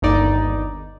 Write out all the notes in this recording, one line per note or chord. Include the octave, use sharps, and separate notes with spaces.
G1 D#2 D#4 D5